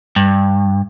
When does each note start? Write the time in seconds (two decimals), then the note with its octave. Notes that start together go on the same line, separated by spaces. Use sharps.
0.16 G2